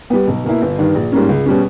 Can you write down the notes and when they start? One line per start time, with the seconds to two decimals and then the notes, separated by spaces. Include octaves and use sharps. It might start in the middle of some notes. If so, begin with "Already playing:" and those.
0.10 G3 B3
0.28 B1
0.44 B2 A#3 E4
0.62 G1
0.79 G2 D#3
0.95 A#1
1.12 G#2 G3 A#3 C#4
1.29 C#2
1.46 B2 G3 C#4